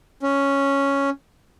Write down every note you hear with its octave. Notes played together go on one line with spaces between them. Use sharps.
C#4